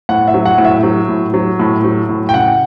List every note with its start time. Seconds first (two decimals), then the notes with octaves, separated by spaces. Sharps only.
0.09 A2 F#5
0.28 E5
0.34 F#3
0.45 F#5
0.58 A2
0.65 E5
0.83 F#3
1.09 A2
1.34 F#3
1.59 A2
1.84 F#3
2.09 A2
2.29 G5
2.34 C#3 F#5